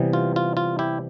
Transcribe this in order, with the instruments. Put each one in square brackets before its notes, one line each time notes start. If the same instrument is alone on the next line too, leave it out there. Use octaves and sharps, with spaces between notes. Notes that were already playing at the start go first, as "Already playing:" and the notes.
Already playing: [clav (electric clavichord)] C3 E3 G3 B3
F4
F4
F4
E4 G4